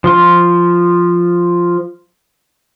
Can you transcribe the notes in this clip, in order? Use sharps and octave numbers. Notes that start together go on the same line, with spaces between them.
F3 F4 C6